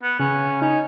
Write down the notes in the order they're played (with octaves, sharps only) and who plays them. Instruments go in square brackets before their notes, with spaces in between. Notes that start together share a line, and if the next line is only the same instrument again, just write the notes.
[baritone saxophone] B3
[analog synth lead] C#3 [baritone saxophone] C#4
[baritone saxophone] C#4 [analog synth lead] D#4